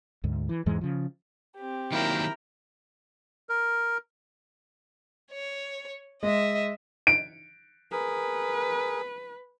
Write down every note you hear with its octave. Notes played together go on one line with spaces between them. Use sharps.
D2 G#2
E3
E2 G#2 E3 G#3
C#3 F3
C4 G4
D#3 F#3 A#3 E4 A#4 G5
A#4
C#5
G#3 D#5 E5
D7
G#4 A#4 B4